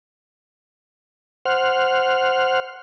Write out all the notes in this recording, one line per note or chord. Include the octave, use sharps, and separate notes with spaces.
C5 F#5 F6